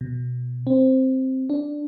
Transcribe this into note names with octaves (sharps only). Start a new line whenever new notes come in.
B2
C4
D4